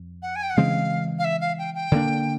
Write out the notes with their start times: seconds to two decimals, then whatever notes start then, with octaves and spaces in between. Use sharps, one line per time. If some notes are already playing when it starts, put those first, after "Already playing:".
Already playing: F2
0.22 F#5
0.36 G#5
0.43 G5
0.50 F#5
0.57 C#3 E3 G#3 C4 F5
1.19 F5
1.24 E5
1.41 F5
1.58 G5
1.75 G5
1.92 D3 G3 A#3 D4